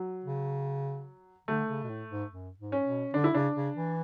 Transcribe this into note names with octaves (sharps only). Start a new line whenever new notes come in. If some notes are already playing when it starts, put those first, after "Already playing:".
Already playing: F#3
C#3
D3 A3
C#3
B2
A2
G#2
F#2
G#2
C#4
B2
D3 D4
E4
C#3 D4
C#3
E3